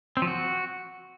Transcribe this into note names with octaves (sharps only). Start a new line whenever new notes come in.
C4
F3
F#4